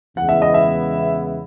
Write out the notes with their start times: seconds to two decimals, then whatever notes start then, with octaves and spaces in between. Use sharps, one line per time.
0.17 E2 C#3 G#3 B3 E4 F#5
0.29 E5
0.42 D#5
0.54 E5